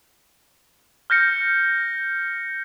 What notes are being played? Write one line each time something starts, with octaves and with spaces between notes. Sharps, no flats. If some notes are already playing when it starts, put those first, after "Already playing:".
F6 G6 A#6 C#7